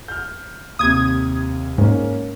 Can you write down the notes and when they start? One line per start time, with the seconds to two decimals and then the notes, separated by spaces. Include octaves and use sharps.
0.08 F6 G6
0.79 D#2 C3 D#6 G#6
1.78 G#2 A#3 C#4